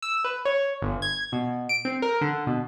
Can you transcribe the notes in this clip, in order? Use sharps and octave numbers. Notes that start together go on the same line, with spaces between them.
E6
B4
C#5
G1
G#6
B2
D7
C4
A#4
D3
B2